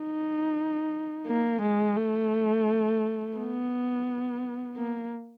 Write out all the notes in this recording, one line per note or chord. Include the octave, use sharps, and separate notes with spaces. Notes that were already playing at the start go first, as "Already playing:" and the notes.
Already playing: D#4
A#3
G#3
A3
B3
A#3